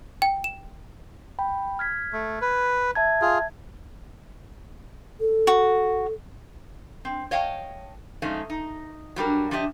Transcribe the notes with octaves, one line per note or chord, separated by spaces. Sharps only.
G5
E7
G5 B5
F6 G#6 B6
A3
B4
E5 A5 G#6
F4 G#4
A4
F#4
C4
C#5 D#5 F5 G5 A5
F3 G#3 A3 C#4 D#4 F5
D#4
F#3 G3 D4 A#4
F3 D4 G4 D#5 E5